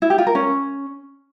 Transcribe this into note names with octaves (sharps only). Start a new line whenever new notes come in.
E4
G4
F4
A#4
C#4